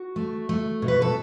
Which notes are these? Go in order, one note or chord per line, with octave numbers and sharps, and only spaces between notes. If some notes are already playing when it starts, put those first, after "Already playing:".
Already playing: F#4
A3
A3
B2
B4
A4